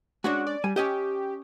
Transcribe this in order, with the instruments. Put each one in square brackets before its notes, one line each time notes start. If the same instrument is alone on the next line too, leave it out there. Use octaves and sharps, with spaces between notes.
[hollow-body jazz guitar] G#3 C#4 D4 [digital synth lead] F#4
[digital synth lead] D5
[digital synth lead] G3 [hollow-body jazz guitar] G#5
[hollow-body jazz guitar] C#4 D#5 G5 [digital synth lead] G4